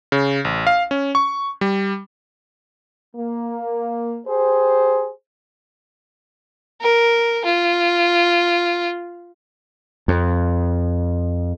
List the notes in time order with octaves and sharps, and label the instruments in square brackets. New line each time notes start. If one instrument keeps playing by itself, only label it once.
[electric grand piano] C#3
A1
F5
C#4
C#6
G3
[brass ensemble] A#3
G4 G#4 C5
[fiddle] A#4
F4
[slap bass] F2